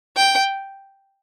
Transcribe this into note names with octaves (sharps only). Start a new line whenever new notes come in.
G5